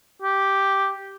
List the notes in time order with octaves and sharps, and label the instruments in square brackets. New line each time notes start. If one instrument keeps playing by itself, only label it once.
[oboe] G4